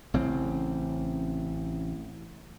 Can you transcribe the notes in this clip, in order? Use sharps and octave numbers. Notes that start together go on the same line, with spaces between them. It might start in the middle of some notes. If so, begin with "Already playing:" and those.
A1 C#3 C4